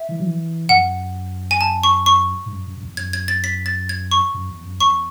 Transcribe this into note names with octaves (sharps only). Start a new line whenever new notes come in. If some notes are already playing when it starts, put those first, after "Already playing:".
Already playing: E5
E3
F#3
E3
F#2 F#5
G#5
A5
C#6
C#6
G#2
F#2
F#2
F#2
E2
F#2 G#6
G#6
A6
B6
A6
G#6
C#6
F#2
E2
F#2
E2 C#6